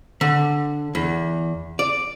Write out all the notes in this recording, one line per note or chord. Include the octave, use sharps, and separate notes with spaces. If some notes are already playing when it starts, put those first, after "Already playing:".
D3
E2
D5